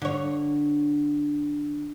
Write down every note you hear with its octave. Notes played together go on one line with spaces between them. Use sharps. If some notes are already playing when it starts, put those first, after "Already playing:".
D3 C#5